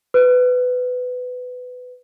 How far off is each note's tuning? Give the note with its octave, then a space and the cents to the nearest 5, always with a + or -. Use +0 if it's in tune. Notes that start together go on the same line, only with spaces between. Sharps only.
B4 +15